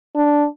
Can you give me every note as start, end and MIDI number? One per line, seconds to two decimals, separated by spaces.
0.15 0.46 62